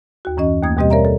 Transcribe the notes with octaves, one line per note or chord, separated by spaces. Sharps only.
D#2 F#4
F#2 E3 C#4 D#5
D#2 A3 A#3 D#6 G#6
D#2 B2 G3 C4 G4 D#5
A#4 C#5 D5 E5 A#5
A4